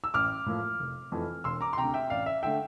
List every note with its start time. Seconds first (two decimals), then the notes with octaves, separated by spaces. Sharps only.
0.04 E6
0.14 A1 D6 F6
0.46 A2 F3 A#3
0.80 F1
1.12 F2 E3 A3
1.44 E1 C6 E6
1.61 A#5 D6
1.73 C6
1.77 D2 C3 G5 A#5
1.94 E5 G5
2.10 A1 D5 F5
2.26 E5
2.43 D3 A3 E5 G5